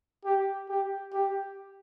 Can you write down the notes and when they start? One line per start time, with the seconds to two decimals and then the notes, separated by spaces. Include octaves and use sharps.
0.25 G4
0.69 G4
1.13 G4